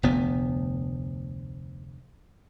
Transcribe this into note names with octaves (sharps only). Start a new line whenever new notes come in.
F1 D2 B3